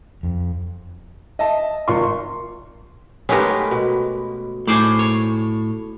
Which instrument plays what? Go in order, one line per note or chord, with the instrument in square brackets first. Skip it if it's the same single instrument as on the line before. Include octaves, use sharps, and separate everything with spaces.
[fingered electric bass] F2
[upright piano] D#5 E5 A5
G#1 F4 C6 C#6
[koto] G#3 A3 B3 [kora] C#4 G4 A#4
[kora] B2
[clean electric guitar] A2 [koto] G#4 C5 D5
[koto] C#5